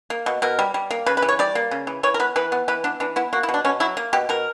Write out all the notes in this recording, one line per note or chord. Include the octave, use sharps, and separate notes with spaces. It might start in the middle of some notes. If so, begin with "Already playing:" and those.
A#3
B2
B2 A#4
G3
G3
A#3
C#3 B4
B4
E3
C#5
G3 D5
A#3
C#3
E3
E3 C#5
A#4
B3 B4
E3 B4
B3
E3 B4
B3 D4
E3 D4
B3 E4
A#3 F#4
E4
B2
D4
B2 C#4
F#3 E4
A#3
B2 G4
B2 A#4